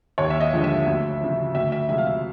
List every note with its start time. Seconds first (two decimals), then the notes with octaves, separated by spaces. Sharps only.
0.18 D#2 C#5
0.30 E5
0.40 D#5
0.53 D3 F3 G#3
0.64 E5
0.86 D2
1.21 C#3 F3
1.55 D2 E5
1.72 E5
1.89 C3 F3 G#3 E5
1.98 F5
2.06 E5